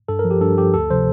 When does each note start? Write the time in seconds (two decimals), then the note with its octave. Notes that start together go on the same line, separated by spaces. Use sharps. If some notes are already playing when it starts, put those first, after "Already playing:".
0.08 G2 A4
0.19 A#4
0.25 F3
0.31 G4
0.41 G2 A4
0.58 F3 G4
0.74 D2 A4
0.90 C3 F3 C5